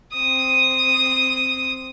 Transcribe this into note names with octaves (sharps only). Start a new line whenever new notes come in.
C4 D#6